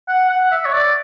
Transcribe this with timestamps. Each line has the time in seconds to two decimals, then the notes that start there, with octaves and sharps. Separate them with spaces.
0.08 F#5
0.29 F#5
0.51 E5
0.65 C#5
0.73 D5